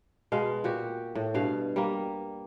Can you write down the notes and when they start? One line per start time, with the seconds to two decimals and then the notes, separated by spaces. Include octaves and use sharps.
0.32 B2 G#3 F5
0.64 A#2 F#4 G4
1.15 A2
1.34 G2 B2 F5
1.76 G3 A#3